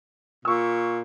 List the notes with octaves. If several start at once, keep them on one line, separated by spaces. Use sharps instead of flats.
A#2 C#6 E6